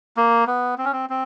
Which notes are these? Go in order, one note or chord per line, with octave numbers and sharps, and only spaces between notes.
A#3
B3
C4
C#4
C4
C4